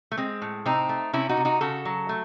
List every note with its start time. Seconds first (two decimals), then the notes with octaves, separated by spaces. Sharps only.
0.12 A3
0.17 G#3 C4
0.42 A2
0.66 C3 C4 D#4
0.89 A3
1.13 C3 C#4 E4
1.29 D#4 F#4
1.37 C3
1.45 D#4 F#4
1.61 C#3 F#4 A4
1.85 F#3
2.09 A3